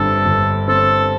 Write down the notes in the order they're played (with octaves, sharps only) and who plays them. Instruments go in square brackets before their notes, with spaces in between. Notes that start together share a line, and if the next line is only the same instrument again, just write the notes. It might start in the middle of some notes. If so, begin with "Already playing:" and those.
Already playing: [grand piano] G1 G2 C4 [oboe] A4
[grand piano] G1
[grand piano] C4 [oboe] A4